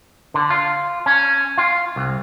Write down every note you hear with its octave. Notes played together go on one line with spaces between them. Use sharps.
D3
F4
C#4
F4
C2